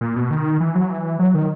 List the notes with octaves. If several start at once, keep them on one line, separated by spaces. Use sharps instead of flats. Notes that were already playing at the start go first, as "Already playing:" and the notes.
A#2
B2
D#3
E3
F#3
E3
F#3
D#3